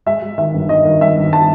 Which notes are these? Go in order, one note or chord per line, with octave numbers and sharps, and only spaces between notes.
G#3 E5
G#3
D#3 E5
G1
D#3 D#5
D#3
G1 E5
G1
A5